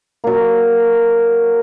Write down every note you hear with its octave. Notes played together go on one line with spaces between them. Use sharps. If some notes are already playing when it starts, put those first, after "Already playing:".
F#3 A#3